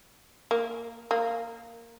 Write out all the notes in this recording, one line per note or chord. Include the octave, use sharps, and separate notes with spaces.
A#3
A#3